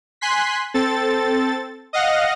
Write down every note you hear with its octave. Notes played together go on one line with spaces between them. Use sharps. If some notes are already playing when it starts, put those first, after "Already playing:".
G#5 C6 F#6 B6
C4 A4 A6
D#5 F5 F#5 A#6